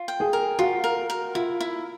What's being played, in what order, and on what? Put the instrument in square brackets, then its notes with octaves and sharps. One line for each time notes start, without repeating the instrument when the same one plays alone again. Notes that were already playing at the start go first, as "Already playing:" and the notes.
Already playing: [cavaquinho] F4
G5
[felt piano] G#4
[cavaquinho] A#4
[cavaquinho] F4 [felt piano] F#4
[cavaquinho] A#4
A#4
[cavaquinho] E4 [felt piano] F4
[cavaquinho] E4